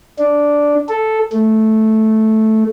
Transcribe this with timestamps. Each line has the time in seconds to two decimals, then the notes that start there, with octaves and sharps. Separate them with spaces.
0.19 D4
0.89 A4
1.33 A3